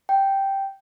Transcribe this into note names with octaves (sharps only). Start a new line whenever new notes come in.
G5